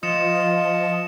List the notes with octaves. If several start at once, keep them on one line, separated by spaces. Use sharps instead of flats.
F3 F4 D#5 D#6 C#7 E7